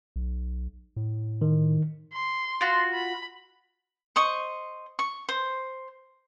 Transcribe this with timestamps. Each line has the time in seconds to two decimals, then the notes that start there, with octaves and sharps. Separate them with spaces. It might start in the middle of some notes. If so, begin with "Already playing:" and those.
0.16 B1
0.96 A2
1.41 D#3
2.13 C6
2.61 F4 F#4
2.94 B5
4.16 C5 D#5 C#6
4.99 C#6
5.29 C5